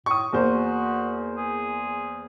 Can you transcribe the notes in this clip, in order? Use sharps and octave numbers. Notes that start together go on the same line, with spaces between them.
A2 C#6 D#6
E2 A#3 F#4 C5
G#4